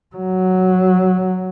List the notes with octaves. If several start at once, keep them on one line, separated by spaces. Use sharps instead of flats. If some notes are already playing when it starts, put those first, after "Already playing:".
F#3